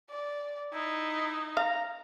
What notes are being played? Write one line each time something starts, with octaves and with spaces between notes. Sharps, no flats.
D5
D#4 E4
F5 A#5